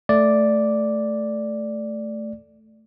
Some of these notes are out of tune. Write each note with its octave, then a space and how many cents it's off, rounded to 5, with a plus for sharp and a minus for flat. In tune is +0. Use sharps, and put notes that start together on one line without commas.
A3 +0 D5 +0